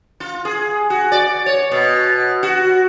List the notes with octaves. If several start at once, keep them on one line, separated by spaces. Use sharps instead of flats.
F4
G#4
F#4
D5
C#5
B2
F#4